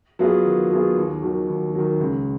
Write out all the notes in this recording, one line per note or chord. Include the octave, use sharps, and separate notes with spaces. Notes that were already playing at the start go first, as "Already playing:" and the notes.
F#3 B3 F4 G#4
D#3
F#3 B3 F4 G#4
D#2
D#3 F#3
D#2
D#3 F#3
C#2